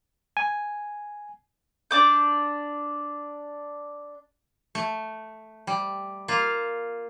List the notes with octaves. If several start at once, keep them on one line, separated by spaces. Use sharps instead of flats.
G#5
D4 D6 G6
A3
G3
A#3 F4